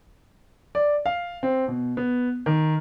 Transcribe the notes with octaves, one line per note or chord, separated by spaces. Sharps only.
D5
F5
C4
B2
B3
D#3